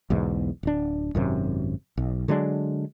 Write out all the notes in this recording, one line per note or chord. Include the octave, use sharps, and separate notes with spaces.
B1 E2 G#2
D1 D4
G#1 F#2 C3
B1
D3 F#3 G#3 D4